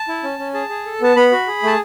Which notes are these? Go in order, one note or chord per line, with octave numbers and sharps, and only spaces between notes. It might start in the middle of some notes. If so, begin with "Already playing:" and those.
Already playing: A5
E4
C#4
C#4
G#4 A5
G#4
A4
B3 A5
B3 B5
F#4
G#4
A3 A5